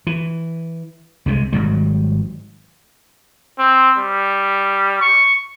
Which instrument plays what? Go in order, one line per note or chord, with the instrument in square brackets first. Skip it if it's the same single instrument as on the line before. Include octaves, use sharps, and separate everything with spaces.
[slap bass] E3
C2 C3 F3 G#3
G#1 G#2 F#3 G3
[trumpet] C4
G3
C#6